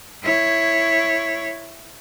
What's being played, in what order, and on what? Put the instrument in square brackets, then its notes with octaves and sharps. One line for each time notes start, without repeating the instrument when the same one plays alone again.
[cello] E4 C#5